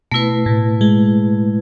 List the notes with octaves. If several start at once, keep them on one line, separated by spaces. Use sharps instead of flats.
B2 A3 E4 B4
A2
G#3